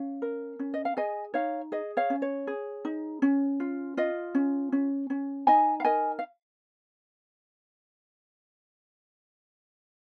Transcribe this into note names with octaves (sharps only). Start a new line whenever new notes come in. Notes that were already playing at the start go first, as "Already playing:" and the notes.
Already playing: C#4 F5
A#4
C#4
D#5
F5
G#4 D#5 G#5
D#4 C#5 F5
G#4 D#5
C#5 F5
C#4
C#5
G#4
D#4
C#4
F4
F4 D#5
C#4
C#4
C#4
D#4 D#5 G#5
F5
A#4 D#5 G#5
F5